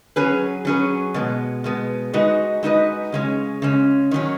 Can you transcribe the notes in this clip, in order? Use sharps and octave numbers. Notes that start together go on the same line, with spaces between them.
F#3 C#4 G#4 B4
F#3 C#4 G#4 B4
B2 G#3 B3
B2 G#3 B3
G#3 D#4 F#4 B4 D#5
G#3 D#4 F#4 B4 D#5
C#3 G#3 C#4
C#3 G#3 C#4
D#3 F#3 C#4